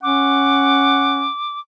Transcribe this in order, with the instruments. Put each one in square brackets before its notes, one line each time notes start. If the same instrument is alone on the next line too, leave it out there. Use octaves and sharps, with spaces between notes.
[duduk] C#4 [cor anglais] F#5 [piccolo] D6